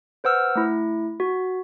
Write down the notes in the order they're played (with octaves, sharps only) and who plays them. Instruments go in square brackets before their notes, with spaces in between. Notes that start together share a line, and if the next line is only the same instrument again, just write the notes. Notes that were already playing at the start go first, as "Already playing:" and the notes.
[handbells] B4 C5 F#5 E6 F6
A3 E4
F#4